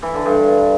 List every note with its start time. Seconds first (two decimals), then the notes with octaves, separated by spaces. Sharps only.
0.03 E3
0.14 D3
0.26 G2